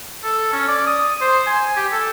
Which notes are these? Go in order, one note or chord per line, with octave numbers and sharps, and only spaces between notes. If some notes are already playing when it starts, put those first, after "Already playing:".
A4
C#4
D5
D#6
C5
G#5
G4
A4